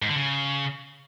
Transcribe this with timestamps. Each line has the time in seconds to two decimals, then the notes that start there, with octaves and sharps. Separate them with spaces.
0.02 G#2
0.09 D3
0.16 C#3